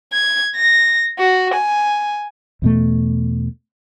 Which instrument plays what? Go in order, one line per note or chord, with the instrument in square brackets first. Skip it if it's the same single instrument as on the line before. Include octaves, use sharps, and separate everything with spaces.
[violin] G#6
A#6
F#4
G#5
[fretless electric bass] E2 B2 A3